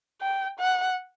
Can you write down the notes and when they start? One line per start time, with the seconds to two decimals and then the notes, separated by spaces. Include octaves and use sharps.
0.21 G5
0.59 F#5